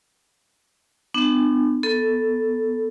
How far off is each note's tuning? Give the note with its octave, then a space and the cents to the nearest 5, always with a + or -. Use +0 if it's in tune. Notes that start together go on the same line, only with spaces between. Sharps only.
B3 +30 D4 +40
B3 +0 A4 +0